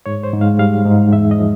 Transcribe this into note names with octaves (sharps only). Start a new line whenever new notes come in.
G#2 C#5
C5
G#2
F5
G3 F5
G#2
E2 E5
D#5
F3